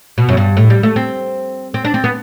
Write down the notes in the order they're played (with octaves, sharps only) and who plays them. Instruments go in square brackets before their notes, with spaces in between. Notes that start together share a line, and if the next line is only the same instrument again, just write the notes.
[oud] B2
F#2
G2
A2
G3
A3
C4
C4
D4
C4
B3